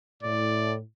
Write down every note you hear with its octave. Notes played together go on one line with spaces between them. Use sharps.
A2 D5